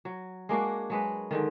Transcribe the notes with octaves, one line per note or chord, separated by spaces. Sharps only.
F#3
G#3 A#3 D4 F#4
F#3 G#3 B4
G#2 D3 D#3